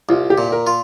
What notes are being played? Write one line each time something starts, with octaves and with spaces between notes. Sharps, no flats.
C2 F4
G4
A#2
A#4
F4